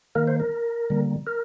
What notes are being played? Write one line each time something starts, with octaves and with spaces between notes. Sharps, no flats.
D#3 A#3 A#4
C5
A#4
D3 G3 A#3
A#4